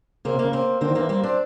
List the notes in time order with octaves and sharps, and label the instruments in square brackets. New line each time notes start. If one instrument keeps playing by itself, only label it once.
[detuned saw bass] C#3 [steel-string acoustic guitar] A#3 C4
[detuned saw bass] C3
[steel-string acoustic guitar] A#3
[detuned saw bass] C#3
[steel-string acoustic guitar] A#3 C4
[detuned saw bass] D3 [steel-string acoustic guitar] A#3 C4
[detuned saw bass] D#3
[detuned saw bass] E3 [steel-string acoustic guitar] A#3 C4
[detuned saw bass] G3 [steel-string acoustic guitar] A#3 C4
[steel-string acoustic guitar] C4 D4